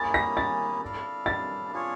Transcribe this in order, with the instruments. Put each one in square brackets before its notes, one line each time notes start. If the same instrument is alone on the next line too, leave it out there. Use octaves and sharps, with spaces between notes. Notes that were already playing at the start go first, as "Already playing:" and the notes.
Already playing: [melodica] A#3 C#4 E4 G#4 [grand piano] A6
[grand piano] A#6
A6
[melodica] E4 A4 D5 F5
[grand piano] A6
[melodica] D4 F4 G#4 C#5